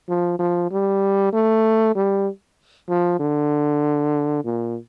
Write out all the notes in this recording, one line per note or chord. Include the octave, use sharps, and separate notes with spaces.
F3
F3
G3
A3
G3
F3
D3
A#2